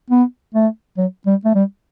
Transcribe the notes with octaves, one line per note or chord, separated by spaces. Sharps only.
B3
A3
F#3
G3
A3
G3